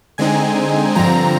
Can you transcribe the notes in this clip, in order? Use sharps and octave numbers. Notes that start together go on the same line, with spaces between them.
D3 G#3 C4 D#4 G#5
G2 D3 F3 C4 A#5